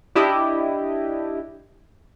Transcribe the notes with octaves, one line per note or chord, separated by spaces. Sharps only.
D4 E4 G4 D#5